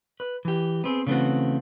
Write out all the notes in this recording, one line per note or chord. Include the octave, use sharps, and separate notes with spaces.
B4
E3 G4
B3 C4 G#4
C#3 E3 A3 B3 C4 F#4